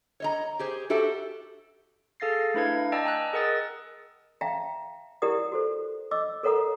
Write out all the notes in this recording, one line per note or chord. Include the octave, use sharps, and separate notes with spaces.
C#5 D#5 A#5
G4 G#4 C5
F#4 G4 A4 E5
G#4 A4 F5 A6 A#6 C7
A3 D4 E4 B4 F5 G#6
D5 D#5 G5 A5 A#5 E6
G5 G#5 A#5 E6 F#6
G#4 A#4 D#5 F#5 D#6 A6
E5 F5 G5 A5 A#5
E4 G4 A#4 D5 F#5 D#6
F#4 A4 C5
D#5 D6 E6
A4 A#4 C#5 F#5 A#5 D#6